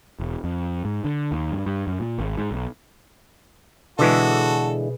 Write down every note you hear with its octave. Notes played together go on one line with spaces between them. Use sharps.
E1
F2
G#2
D3
D#2
G2
G2
F#2
A#2
G#1
G#2
B1
B2 D3 E3 G#3 F#4 G#4 A4 B4